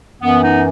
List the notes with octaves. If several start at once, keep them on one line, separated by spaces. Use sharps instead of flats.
F#2 E3 B3
B3 D#4